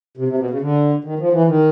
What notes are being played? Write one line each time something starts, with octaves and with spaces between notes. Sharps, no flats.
C3
C3
B2
C#3
D3
D#3
F3
E3
D#3